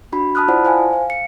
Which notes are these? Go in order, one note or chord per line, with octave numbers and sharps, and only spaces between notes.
D4 F#4 B5
A5 B5 D#6 F6 F#6
E4 F4 C5 D5 F#5 A5
C5 F5 G#5
F5
C#7